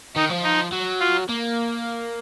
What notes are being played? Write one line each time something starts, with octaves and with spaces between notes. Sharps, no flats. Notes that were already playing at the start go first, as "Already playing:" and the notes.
D#3 D#4
F3
D#4
F#3
F4
A#3